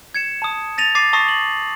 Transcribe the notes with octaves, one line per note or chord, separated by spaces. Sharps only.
G#6 C#7 E7
A5 D#6
A6 A#6 D#7 F7
D6 A6 C7 D#7
A5 C#6 D#6 A6 A#6 C7
F#7